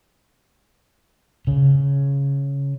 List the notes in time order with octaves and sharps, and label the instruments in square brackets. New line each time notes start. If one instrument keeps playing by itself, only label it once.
[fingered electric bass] C#3